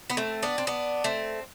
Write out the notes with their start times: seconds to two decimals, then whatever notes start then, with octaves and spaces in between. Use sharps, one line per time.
0.10 B3
0.17 A3 C4
0.43 B3 D4
0.58 C4
0.67 B3 D4
1.04 A3 C4